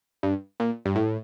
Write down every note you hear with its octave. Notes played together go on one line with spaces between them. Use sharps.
G2
A#2
G2
A2